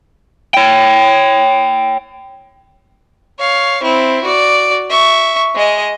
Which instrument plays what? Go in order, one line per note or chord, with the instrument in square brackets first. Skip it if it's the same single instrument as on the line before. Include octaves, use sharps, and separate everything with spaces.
[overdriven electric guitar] C#5 G5
[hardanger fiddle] C#5 F5
C4 E4
F#4 D5
E5 C#6
G#3 D#5